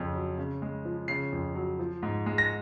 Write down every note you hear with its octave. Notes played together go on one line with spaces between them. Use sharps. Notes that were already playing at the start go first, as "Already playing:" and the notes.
Already playing: F2 C#3
F#3
C#3
G#3
F3
C#3 C7
F2
F#3
F3
G#2
G#3
A#6